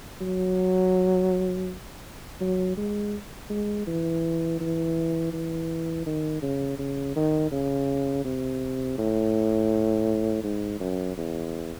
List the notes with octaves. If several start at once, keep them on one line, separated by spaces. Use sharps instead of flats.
F#3
F#3
G#3
G#3
E3
E3
E3
D#3
C#3
C#3
D#3
C#3
C3
A2
G#2
F#2
E2